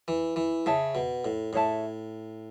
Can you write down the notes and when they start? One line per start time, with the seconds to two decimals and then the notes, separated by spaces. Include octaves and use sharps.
0.08 E3
0.36 E3
0.66 C#3 G#4 C#5 E5 A5
0.95 B2
1.25 A2
1.53 A2 G#4 C#5 E5 A5